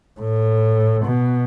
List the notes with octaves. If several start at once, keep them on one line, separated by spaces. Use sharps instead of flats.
A2
B2